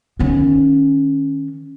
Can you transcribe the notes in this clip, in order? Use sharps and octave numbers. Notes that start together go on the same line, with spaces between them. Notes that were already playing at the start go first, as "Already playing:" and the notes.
D#3 C#4